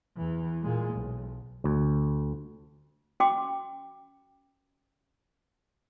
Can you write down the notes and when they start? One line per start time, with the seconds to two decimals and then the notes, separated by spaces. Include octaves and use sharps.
0.17 E2 E3
0.63 A#2 G#3
0.94 B1
1.64 D2
3.20 C#4 F#4 G5 C6 D6